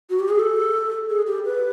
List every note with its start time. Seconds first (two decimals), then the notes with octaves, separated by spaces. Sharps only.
0.10 F#4
0.20 G4
0.29 G#4
0.39 A4
1.09 G#4
1.27 G4
1.45 B4